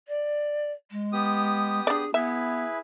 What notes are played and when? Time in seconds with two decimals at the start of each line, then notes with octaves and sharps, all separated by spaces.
0.08 D5
0.91 G#3
1.13 B3 G4 D#6
1.87 D4 G#4 D5
2.14 B3 E4 G#4 B4 E5